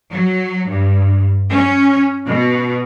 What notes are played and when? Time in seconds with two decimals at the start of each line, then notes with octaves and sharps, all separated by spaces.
0.12 F#3
0.69 G2
1.52 C#4
2.27 B2